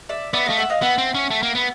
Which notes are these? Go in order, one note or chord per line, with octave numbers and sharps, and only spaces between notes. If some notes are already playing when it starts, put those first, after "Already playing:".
D5 E5
B3 D5 E5
A3 D#5 F5
E5 F#5
D#5 F5
B3 E5 F#5
C4
C#4
A3
A#3
B3